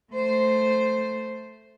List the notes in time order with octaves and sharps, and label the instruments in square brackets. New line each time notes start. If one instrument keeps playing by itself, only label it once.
[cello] A3 C5